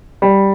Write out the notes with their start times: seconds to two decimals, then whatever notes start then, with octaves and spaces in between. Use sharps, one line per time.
0.22 G3